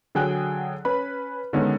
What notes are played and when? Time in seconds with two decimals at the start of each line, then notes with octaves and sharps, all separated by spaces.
0.15 D3 F#3 G#4 G5 G#5 F#6
0.85 C#4 B4 B5
1.53 D3 D#3 G#3 B3 C#4